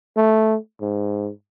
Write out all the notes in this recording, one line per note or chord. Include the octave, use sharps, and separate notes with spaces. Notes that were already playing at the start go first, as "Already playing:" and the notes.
A3
G#2